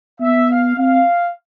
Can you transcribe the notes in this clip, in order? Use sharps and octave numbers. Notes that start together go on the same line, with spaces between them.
B3 E5
F5
C4 F5